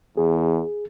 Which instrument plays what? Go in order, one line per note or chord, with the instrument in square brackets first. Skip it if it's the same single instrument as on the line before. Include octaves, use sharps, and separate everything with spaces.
[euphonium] E2 [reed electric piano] G#4